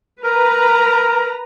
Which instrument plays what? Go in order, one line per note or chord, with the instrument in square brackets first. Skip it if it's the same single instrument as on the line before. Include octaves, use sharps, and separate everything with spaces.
[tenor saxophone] A#4 [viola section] B4 A#5